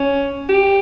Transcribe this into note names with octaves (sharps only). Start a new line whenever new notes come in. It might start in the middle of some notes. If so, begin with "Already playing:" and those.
Already playing: C#4
G4